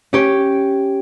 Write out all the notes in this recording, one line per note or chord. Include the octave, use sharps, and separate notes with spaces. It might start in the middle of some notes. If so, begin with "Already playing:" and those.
C#4 G4 C#5